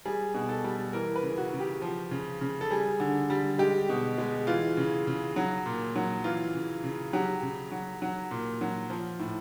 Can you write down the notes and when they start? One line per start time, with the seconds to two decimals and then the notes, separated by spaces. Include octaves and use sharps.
0.05 G3 G#4
0.34 B2
0.49 A4
0.64 G3
0.93 E3 A#4
1.16 B4
1.23 C#3
1.38 F#4
1.53 C#3
1.60 G4
1.82 F3
2.11 C#3
2.41 C#3
2.61 A4
2.70 G3 G#4
3.00 D3
3.30 G3
3.59 G#3 G4
3.89 B2
4.18 G#3
4.47 E3 F4
4.77 C#3
5.07 C#3
5.36 F#3
5.66 A#2
5.96 F#3
6.24 E3 F4
6.54 C#3
6.84 C#3
7.13 F#3 G4
7.43 C#3
7.72 F#3
8.02 F#3
8.31 A#2
8.61 F#3
8.90 F3
9.19 A2